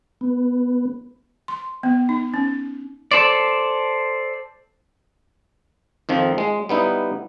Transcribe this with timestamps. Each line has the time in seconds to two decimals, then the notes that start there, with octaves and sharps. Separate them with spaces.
0.21 B3
1.48 C6
1.83 B3
2.09 D#4
2.34 C#4
3.11 A4 C5 D5
6.09 F2 D#3 F3
6.38 G#3
6.69 G3 B3 D#4 E4